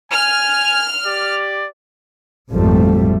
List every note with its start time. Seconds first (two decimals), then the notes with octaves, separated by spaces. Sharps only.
0.11 G#5 F6
1.05 G4 D5
2.52 G#1 F2 A#2 F3 G3 A3